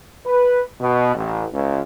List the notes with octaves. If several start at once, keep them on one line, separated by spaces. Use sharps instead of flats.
B4
B2
A1
C#2